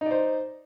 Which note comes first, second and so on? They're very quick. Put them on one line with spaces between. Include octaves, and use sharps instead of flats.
D#4 D5 C5